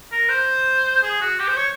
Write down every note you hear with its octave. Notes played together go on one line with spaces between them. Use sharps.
A#4
C5
G#4
F#4
G4
C5
C#5